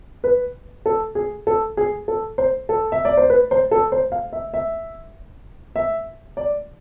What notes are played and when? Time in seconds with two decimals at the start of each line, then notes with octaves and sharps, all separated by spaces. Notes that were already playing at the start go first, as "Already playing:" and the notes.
0.24 B4
0.86 A4
1.15 G#4
1.47 A4
1.77 G#4
2.08 A4
2.38 C5
2.69 A4
2.92 E5
3.05 D5
3.17 C5
3.30 B4
3.51 C5
3.71 A4
3.92 C5
4.12 F5
4.33 E5
4.54 E5
5.76 E5
6.37 D5